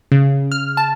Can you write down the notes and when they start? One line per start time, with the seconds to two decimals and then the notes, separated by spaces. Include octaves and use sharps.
0.12 C#3
0.52 F6
0.77 A5